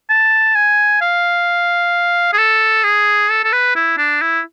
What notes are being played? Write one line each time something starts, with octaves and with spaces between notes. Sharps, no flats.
A5
G#5
F5
G#4
A4
G#4
A4
A4
B4
E4
D4
E4